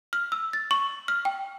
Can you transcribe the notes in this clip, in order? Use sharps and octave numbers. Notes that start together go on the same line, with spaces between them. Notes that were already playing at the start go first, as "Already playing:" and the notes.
F6
E6
A6
C#6
F6
G5